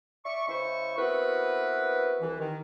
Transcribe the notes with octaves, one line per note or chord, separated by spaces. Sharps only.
D5 E5 C#6
C#3 G#3 E4 C5 C#6
B3 C4 E4 F#4 A#4 B4
C2 E3
D#3